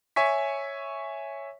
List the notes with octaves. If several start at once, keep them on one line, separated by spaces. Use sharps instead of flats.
C#5 E5 G#5 C#6 B6